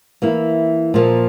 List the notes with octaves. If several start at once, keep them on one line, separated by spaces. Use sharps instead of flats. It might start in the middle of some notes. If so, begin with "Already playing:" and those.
E3 A#3 E4
A#2 F3 A#3